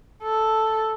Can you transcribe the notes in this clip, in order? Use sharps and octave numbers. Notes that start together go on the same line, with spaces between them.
A4